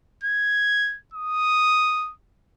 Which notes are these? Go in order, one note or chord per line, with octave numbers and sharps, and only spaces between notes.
G#6
D#6